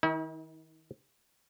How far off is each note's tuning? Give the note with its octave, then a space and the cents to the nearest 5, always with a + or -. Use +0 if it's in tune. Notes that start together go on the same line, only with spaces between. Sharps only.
D#3 +25 E4 -45